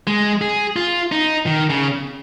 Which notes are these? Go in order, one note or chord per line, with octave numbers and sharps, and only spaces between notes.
G#3
G#4
F4
D#4
D#3
C#3